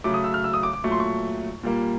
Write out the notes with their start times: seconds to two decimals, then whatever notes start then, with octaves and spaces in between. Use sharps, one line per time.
0.04 C#3 F#3 A3 D6
0.14 D#6
0.24 E6
0.34 F6
0.44 E6
0.54 D#6
0.63 D6
0.73 D6
0.84 A#2 F#3 A3 C#6
0.92 C6
1.00 C#6
1.63 A#2 G3 A#3